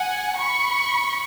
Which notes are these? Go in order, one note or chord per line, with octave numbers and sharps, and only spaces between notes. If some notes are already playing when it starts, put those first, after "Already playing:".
Already playing: F#5 G#5
B5 C#6